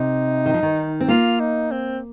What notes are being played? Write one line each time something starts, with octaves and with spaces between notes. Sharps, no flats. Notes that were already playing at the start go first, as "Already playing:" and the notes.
Already playing: C3 D#4
D#3
F3
D#3
C4
A#3 F4
D#4
C4